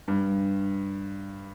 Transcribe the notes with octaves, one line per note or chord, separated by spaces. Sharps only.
G2